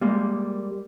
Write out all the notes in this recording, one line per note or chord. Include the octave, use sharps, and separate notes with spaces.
G3 G#3 A#3